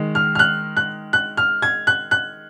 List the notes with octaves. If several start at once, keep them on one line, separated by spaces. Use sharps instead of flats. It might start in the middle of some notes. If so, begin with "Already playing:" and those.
Already playing: D#3 G#3
F6
F6
F#6
F#6
F#6
F6
G#6
F#6
F#6